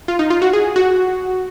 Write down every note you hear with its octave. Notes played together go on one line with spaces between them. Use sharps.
F4
D#4
F4
F#4
G#4
F#4